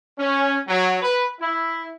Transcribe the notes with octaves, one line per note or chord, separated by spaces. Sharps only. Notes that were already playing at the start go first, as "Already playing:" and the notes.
C#4
F#3
B4
E4